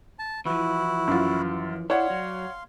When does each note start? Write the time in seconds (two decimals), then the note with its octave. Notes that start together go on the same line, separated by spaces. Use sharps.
0.19 A5
0.45 E3 F3 E4 F#4
1.08 F#2 F4
1.90 E4 C#5 D5 F5 F#5 C6
2.10 F#3